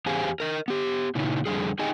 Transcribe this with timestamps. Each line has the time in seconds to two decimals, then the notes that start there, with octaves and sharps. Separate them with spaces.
0.06 E2 G4 G#4 C5 F5 G#5
0.40 A#4 D#5
0.68 B3 G4
1.15 A#2 C#3 D#4 E4
1.46 F2 A#2 D3 G3 G#4
1.79 D#4 G4 G#4 D#5 G5 G#5